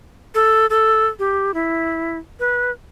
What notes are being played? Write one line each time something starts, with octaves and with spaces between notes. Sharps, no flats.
A4
A4
G4
E4
B4